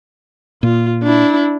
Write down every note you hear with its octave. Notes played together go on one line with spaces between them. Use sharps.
A#2 F4
D4 E4